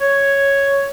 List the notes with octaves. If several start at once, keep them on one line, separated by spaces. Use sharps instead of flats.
C#5